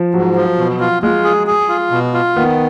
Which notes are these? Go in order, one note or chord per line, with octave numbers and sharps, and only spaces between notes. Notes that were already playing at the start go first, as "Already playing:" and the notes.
Already playing: F3
G#2 F#3
F3
B2
F4
G#3 F4
G#4
G#4
F4
B2
F4
D#3 B3